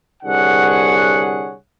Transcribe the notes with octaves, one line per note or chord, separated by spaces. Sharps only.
C2 D3 G#4 C#5 F#5